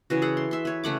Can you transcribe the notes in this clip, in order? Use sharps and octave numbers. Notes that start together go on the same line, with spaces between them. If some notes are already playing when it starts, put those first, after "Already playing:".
C#3 E3 F#4
G#4 A4 F#5
C6
E5 C6
B4 C#5
C#3 A3 F#5 D6